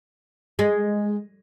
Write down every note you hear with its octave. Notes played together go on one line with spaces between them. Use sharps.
G#3